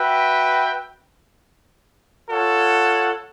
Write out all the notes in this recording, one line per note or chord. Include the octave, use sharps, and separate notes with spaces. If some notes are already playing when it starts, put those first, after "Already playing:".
Already playing: F#4 B4 E5 G5
F4 A4 C#5 F#5